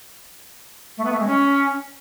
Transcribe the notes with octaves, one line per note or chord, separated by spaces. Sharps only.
A3
B3
A3
G#3
C#4